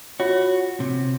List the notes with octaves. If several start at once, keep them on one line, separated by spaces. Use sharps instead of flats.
F4 F#4 C#5
C3